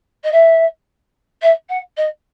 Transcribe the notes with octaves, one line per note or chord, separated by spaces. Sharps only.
D#5
E5
E5
F#5
D#5